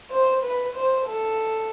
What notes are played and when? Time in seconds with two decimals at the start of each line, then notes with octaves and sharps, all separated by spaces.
0.11 C5
0.44 B4
0.75 C5
1.07 A4